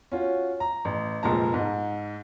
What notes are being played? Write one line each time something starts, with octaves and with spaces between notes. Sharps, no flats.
C#4 F4 F#4
A#5
A1
F1 A#2 F3 G#3 A5 A#5
G#2